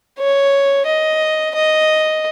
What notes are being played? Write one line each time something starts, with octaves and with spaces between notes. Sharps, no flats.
C#5
D#5
D#5